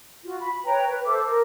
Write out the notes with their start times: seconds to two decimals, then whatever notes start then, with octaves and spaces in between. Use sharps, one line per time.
0.23 F4 F#4
0.40 B5
0.65 B4 C#5 G5 A#5
0.89 B4
1.06 A4 C5 E5 D6
1.24 A#4